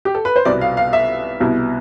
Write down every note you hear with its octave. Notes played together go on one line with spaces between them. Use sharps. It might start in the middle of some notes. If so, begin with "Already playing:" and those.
G4
A4
B4
C5
C2 B2 B3 D5
F5
F5
E5
C2 B2 B3 E4